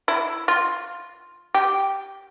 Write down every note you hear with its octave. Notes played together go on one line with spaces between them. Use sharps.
E4
F4
G4